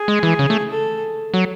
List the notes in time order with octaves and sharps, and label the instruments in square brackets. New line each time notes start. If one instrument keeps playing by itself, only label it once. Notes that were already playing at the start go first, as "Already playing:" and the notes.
Already playing: [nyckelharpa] G#4
[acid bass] G#3
E3
C#3
A3
[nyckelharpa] A4
[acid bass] F#3